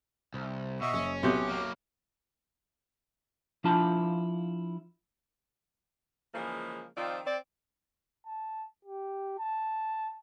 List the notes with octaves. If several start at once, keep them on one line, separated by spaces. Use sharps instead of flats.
C2
B2 D#5 E5 C#6
F#1 C#4
B1 C3 B3 G4 D6 G6
F#3 A#3
F3 D4 E4 F4 A5
C#3 E3 F3 G#3 A#3
D#3 F3 C4 D#4 F4 D5
C4 D5
A5
G4
A5